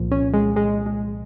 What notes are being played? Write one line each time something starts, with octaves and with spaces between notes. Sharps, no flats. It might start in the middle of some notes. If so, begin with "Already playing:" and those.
Already playing: C2 A#2 F3
C#4
G#3
G#3
G#3